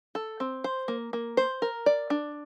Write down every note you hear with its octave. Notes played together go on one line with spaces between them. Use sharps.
A4
C4
C5
A#3
A#3
C5
A#4
D5
D4